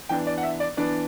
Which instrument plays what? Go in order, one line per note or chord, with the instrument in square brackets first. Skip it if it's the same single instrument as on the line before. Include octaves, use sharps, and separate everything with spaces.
[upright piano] E3 B3 D4 G5
D5
F#5
E5
D5
E3 B3 D4 D5